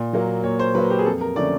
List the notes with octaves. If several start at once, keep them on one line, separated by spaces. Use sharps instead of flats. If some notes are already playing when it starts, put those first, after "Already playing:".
Already playing: A#2
F#3 A#3
A#2 C#5
C5
F#3 A#3 B4
G4
G#4
F2 A4
A#4
D3 F3 A3 C#4 D5